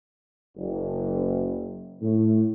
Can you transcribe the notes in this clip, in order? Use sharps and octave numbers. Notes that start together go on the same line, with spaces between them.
F#1
A2